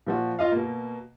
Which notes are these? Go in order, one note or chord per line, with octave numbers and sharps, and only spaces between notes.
A#2 F3 F#4
F4 D#5 F5
B2 A#3